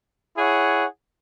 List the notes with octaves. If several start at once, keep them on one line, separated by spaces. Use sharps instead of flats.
E4 G#4 C#5 F#5